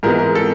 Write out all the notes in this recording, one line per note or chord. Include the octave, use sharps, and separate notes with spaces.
G#2 E3 G#3 B3 A#4
A#4
A4